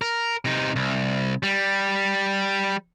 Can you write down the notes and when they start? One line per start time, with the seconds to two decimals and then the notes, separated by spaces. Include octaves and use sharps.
0.02 A#4
0.45 C3 D#4
0.76 C2
1.43 G3